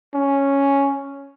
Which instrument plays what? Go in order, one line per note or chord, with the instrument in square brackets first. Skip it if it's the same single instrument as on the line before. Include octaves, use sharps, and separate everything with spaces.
[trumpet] C#4